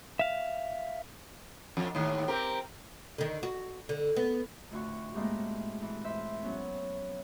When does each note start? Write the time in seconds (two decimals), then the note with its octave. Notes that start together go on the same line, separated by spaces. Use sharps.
0.19 E5 F5
1.77 F2
1.95 D#2 A2
2.28 C4 G4 A#4
3.18 D3 D#3
3.43 F#4
3.89 D3
4.16 B3
4.71 F2 A2 D3 F#4 C#6
5.14 A2 G#3 A#3 C4 F#4 G4
5.82 E3
6.04 C5 E5
6.42 F#3 B3 C#4